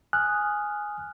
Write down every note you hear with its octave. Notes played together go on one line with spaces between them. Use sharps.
G#5 D#6 F6 F#6